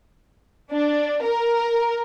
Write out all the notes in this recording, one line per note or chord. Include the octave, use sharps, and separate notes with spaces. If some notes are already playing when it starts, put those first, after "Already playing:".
D4
A#4